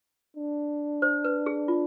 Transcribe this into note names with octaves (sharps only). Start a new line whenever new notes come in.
D4
C5
B4
G#4
F4